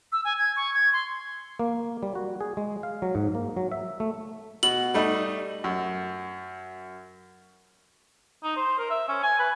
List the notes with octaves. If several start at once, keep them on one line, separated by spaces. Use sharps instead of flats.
E6
G#5
G#6
C#6
G#6
C6
A#3
G3
F#4
G#4
G#3
F5
F#3
G#2
A#3
F#3
E5
A3
B2 F#7
G3 A3 D#4
F#2
D#4
C5
A#4
E5
C#4
G#5
B4